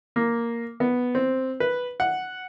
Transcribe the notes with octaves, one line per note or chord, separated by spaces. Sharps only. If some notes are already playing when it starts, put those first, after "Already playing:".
A#3
B3
C4
B4
F#5